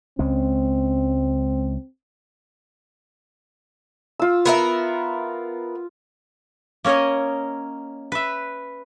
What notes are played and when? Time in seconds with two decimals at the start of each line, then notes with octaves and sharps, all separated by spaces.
0.19 C#2 G#3 C4 C#4
4.19 F4 E6
4.46 B3 A#4 E5
6.85 A#3 C#4 A#4 C#5 D#5
8.12 B4 E5